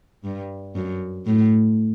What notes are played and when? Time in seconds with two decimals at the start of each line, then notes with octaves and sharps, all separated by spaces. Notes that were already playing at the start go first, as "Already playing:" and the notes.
0.24 G2
0.76 F#2
1.26 A2